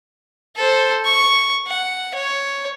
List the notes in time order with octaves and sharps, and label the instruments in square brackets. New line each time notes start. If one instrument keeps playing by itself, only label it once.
[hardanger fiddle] A4 C5
C#6
F#5
C#5